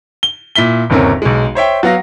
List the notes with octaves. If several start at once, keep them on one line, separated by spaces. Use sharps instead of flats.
G7
A#2 E4 B6 G7
G1 D#2 C3 C#4 A#4
B1 G#3
C5 C#5 E5 G5
F#3 B3 F5 A#6